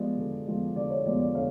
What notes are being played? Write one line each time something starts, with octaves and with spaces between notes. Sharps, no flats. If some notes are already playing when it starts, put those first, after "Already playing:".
Already playing: F3 G#3 B3 D5
D3
F3 G#3 B3
D3 D5
C#5
F3 G#3 B3 D5
D5
D3 C#5 F5